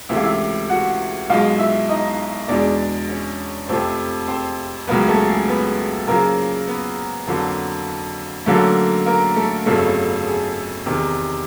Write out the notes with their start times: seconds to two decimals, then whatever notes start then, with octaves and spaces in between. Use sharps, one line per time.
0.09 C#2 C3 E3 A3 E5
0.17 F5
0.23 E4 E5
0.69 F#4 F#5
1.30 B1 B2 G#3 F4 F5
1.59 E4 E5
1.89 D#4 D#5
2.48 E2 B2 G#3 D4 D5
3.09 C#4 C#5
3.68 F2 C3 F3 A3 C4 C5
4.28 C4 C5
4.87 C#2 C#3 F#3 A#3 B3 B4
5.08 A3 A4
5.28 G#4
5.48 B3 B4
6.07 F#2 C#3 F3 A#3 A#4
6.67 B3 B4
7.27 F2 D3 F#3 A#3
8.46 F#2 D3 F#3 A3 A#3 A4
9.06 A#3 A#4
9.36 A3 A4
9.66 G1 F2 C#3 F#3 A3 A4
10.26 G#4
10.86 E2 C3 D#3